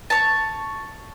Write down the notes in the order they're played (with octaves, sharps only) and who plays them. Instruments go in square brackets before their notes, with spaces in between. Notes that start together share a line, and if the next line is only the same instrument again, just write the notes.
[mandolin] C#5 A5